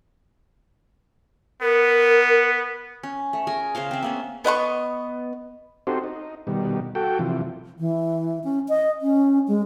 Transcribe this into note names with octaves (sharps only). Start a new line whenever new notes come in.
B3 A#4
C#4
A3
G#4 A#4 G#5
C#3 C#4 C5 F5
C4 E5
A#3 B3 C#4
B3 D#5 F#5 C#6
C4 D#4 F#4 G4 A4 C5
D#4
B2 D#3 G3
F#4 A4 G5
C3 E3 F3
E3
C#4
D#5
C#4
G#3